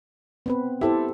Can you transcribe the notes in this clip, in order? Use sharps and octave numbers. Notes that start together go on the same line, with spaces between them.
B3 C4 B4
E4 G4 A4 C5